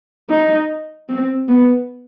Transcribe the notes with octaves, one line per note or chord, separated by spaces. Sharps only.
D#4
C4
B3